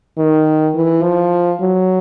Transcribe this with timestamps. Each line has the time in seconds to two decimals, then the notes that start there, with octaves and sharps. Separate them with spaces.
0.18 D#3
0.75 E3
1.03 F3
1.61 F#3